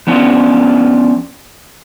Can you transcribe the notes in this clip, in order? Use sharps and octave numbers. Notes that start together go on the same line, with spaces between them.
F3 B3 C#4 D4 E4 F4